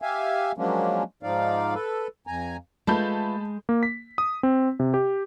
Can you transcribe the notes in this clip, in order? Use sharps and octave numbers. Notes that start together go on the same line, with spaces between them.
G4 E5 F5 G#5
F3 F#3 G#3 A#3 C#4 D4
G#2 F3 D#4 D5 F5
A4 B4
F2 G#5 A#5
G#3 A3 F4 B4 A5 B5 G6
A#3
B6
D#6
C4
C3
G4